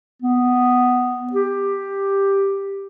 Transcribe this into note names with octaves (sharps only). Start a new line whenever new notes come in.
B3
G4